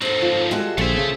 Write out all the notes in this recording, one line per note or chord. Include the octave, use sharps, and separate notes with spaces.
G#2 F#3 C4 A4
F3
G3 G#3 F4 F#4 A4
A#1 D3 A3 G#4 C5 E5
C#3